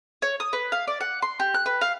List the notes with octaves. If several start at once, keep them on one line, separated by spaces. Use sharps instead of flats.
C#5
D#6
B4
F5
D5
F#5
C6
G4
F#6
B4
F5